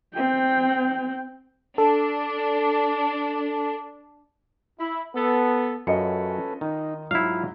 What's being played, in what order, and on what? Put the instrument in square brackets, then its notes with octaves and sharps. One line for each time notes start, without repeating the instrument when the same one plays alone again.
[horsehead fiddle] C4 G5
[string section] D4 [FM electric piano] A4
[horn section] E4
B3 A4
[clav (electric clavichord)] F#2 [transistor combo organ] C#4 A4 B4 [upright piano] F4 D#5 C#7
[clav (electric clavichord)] D#3 [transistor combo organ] D#4
[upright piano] G#2 F#3 [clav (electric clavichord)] E4 F5 [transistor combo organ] F4